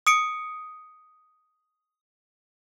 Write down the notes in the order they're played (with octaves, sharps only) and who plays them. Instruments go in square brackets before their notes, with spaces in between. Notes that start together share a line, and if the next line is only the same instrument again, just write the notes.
[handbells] D#6 C#7 D7